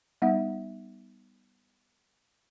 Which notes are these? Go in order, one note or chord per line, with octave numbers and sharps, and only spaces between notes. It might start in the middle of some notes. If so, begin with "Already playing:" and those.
G3 B3 D#4 E5 F#5